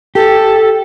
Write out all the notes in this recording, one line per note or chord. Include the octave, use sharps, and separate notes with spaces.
G4 A4